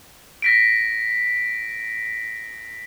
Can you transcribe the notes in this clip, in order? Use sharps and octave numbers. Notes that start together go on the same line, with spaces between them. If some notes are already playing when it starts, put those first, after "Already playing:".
A#6 B6 D7